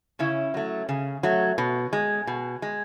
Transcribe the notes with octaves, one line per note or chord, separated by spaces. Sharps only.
C#3 C#4 E4
F#3 A3
C#3
F#3 A3
B2
G#3
B2
G#3